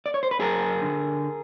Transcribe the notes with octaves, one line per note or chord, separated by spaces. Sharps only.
D5
C#5
C5
B4
F#2 G#4 A#4
D3